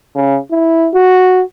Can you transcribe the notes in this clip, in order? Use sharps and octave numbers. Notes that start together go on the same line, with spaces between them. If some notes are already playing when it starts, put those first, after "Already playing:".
C#3
E4
F#4